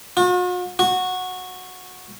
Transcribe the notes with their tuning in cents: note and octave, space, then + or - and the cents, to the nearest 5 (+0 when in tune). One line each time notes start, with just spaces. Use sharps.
F#4 -45
F#4 -10